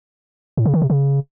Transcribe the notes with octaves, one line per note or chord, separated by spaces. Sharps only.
A2
C#3
D#3
C3
C#3